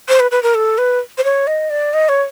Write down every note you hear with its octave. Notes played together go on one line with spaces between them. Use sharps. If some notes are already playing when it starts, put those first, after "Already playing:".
C5
B4
B4
A#4
A4
B4
C5
C#5
D#5
D5
D#5
C#5